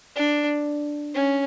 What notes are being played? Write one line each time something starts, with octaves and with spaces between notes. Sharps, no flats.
D4
C#4